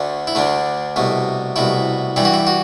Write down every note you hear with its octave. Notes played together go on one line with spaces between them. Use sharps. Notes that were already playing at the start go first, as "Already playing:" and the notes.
Already playing: D2 D3 A3
E4
D2 D3 A3 D4
C2 B2 A3
C2 B2 A3 E4
G2 E3 G3 E4
F#4
E4
F#4